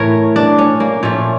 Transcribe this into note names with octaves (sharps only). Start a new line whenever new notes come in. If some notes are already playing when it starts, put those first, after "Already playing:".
Already playing: A2 E3 A3 A#4 C#5
D4
C#4
A#3
A#2 F3 A3 C#4